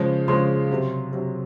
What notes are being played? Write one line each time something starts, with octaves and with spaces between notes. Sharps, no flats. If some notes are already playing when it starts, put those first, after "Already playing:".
Already playing: C#3 F3 G#3
C#3 F3 G#3 C6
C3 F#3
C3 F#3